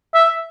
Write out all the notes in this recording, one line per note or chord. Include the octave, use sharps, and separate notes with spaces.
E5